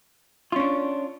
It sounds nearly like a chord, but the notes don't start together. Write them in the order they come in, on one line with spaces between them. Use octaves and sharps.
F4 C#4 D4